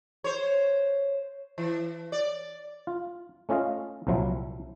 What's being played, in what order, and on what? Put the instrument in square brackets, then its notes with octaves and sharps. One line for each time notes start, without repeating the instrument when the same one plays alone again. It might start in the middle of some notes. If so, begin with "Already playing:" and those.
[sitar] C5 C#5
E3
D5
[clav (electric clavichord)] F4
A3 C#4 F4 D#5 F5
C2 A#2 F3 F#3 E4